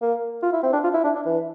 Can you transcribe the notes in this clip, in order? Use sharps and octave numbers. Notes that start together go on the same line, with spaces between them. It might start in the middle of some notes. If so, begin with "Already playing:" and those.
A#3
F4
E4
C4
D4
F4
E4
D4
D4
E3